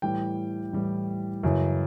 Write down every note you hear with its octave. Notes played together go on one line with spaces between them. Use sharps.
A2 E3 G3 G5
A2 E3 G3
F#2 C#3 E3